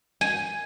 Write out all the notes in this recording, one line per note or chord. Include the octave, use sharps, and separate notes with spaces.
G#5